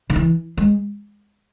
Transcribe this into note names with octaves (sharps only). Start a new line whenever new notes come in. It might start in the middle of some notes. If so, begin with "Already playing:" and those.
D3
E3
G#3